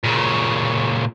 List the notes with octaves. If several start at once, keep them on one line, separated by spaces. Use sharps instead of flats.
A#2 C#3